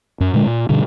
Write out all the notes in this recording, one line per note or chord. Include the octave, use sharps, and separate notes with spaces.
F#2
A#2 D3 G#3
A#2
G2 B2 D3